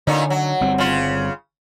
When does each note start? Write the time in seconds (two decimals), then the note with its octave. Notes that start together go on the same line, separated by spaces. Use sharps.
0.07 A#2 D3 C#4 D#4
0.30 F#3
0.61 G1 G3 C4
0.78 C#3 F4